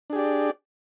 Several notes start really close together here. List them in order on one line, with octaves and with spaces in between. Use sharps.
D4 G#4 G4 D5